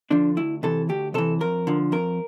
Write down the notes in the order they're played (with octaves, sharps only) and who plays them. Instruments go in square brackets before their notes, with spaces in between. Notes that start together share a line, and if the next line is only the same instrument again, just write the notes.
[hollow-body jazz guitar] D3 F3 D4
D2 E4
C3 E3 A4
D2 G4
C3 E3 A4
F2 A#4
D3 F3
F2 A#4